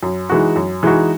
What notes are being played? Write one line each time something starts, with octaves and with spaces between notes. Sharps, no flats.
F#2
E3 G#3 D#4 F#4
F#2
E3 G#3 D#4 F#4